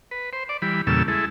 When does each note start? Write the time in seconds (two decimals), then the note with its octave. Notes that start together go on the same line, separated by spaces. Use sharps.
0.11 B4
0.33 C5
0.49 D5
0.62 E3 G3 B5
0.87 E2 A#2 C#3 G3 A4 E6
1.08 G#3 E4 A4